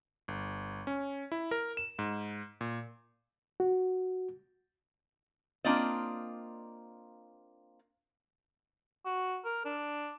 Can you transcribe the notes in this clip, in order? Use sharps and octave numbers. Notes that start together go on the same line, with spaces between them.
G1
C#4
E4
A#4
E7
G#2
A#2
F#4
A#3 C4 D4 F4 D5 D#5
F#4
A#4
D4